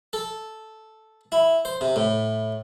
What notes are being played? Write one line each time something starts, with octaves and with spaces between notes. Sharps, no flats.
A4
E4
C5
C3
A2